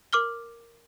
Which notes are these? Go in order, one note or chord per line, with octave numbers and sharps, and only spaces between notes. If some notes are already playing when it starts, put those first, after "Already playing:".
A#4 D6 F6 G7